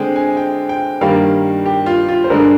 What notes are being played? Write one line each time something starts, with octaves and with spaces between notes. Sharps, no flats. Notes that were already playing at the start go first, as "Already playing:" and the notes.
Already playing: D3 G#3 C4 G5
G#5
G5
G5
G2 D#3 G3 A#3 F5
G4
F4
F4
C5
G2 D3 G#3 A#4